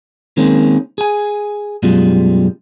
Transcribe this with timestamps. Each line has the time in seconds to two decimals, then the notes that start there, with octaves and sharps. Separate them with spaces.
0.37 D#3 G#3 A#3 C4 C#4
0.98 G#4 G#5
1.83 F#2 B2 G3 G#3 F4